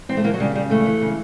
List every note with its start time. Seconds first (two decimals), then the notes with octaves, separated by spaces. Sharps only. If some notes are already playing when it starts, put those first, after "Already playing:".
0.09 E3 C4
0.17 A3
0.24 E3 A#3
0.34 F#3
0.40 C#3 G3
0.55 C#3 G3
0.70 E3 A3
0.86 E3
1.01 C#3